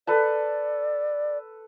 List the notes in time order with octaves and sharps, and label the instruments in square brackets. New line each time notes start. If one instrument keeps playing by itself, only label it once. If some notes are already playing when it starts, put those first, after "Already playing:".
[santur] A4 B4 A5 [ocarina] D5